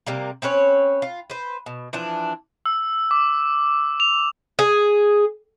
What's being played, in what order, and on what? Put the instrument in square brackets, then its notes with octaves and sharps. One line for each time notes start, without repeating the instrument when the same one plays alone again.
[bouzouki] C3 G3 A#3
C4 C#4 B4 C#5
F4
B4 C5
B2
E3 F3 D4
[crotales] E6
D6
F7
[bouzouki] G#4